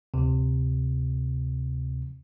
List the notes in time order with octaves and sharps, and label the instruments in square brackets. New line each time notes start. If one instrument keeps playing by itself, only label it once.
[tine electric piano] D2 C3